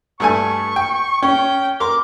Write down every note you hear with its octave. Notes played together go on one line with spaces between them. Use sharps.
G2 A3 G#5 C#6
G5
C#4 G5
A#4 C6 D6